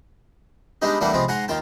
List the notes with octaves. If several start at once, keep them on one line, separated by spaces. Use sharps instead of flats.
G3 G#3 B3 D4 D#4 G4
E2 G3 A3 A#3 D4 F#5
C3 F3 G#3 B3 C4
G#2 F#5 G#5 A#5 C6
D#2 D#3 F4 G5 A5